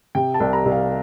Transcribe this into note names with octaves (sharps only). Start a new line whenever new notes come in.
C3 G5
A5
C2
A#5
C2
F5